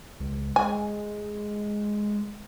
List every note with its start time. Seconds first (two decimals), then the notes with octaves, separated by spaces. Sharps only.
0.20 C#2
0.56 G#3 G#5